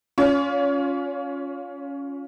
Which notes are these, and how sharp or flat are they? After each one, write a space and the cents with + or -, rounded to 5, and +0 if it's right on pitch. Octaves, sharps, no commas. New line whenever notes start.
C#4 +10 F4 +15 C#5 +40